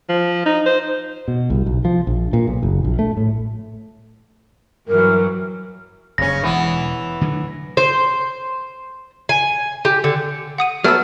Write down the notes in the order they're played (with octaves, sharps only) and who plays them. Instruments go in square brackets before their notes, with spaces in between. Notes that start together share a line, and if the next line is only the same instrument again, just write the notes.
[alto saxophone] F3
D#4
C5
[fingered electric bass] B2
C2
B1
F3
A#1
A#2
B1
F#1
A#1
A3
A2
[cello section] G2 E3 F#3 [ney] A#4
[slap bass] F#1 G2 [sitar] C#3 C#4 [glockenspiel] A#6
[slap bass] E1 E2 B2 [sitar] E3 B3
[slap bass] D3 F#3 A3
[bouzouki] C5
G#5
G4
D3
[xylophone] F#5 D#6 D#7
[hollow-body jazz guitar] F#3 A3 B3 [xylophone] E6 F6